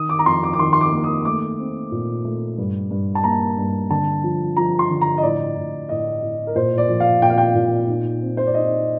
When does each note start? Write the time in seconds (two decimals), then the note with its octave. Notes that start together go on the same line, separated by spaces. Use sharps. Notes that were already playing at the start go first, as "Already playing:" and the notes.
Already playing: D#3 D#6
0.09 D6
0.19 A#5
0.26 F2 C6
0.43 D6
0.53 D6
0.59 D#3 C6
0.73 C6
0.81 D6
0.92 A#3
1.04 D#6
1.25 A3 D6
1.59 C4
1.91 A#2
2.25 A3
2.58 G2
2.91 G2
3.15 A5
3.24 A#3 A#5
3.58 G2
3.90 D3 A5
4.24 F3
4.57 F3 A#5
4.79 C6
4.90 D3
5.01 A#5
5.18 D#5
5.23 A2 D5
5.57 A2
5.89 A2 D#5
6.23 A2
6.47 A#4
6.55 A#2 C5
6.78 D5
6.89 F3
7.00 F5
7.22 A#2 G5
7.30 F5
7.38 G5
7.55 A#2
7.88 D#4
8.22 C4
8.37 C5
8.46 D5
8.54 D#4 D#5